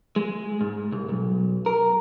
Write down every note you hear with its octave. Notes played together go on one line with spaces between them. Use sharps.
G#3
G#2
C2
B1
A#4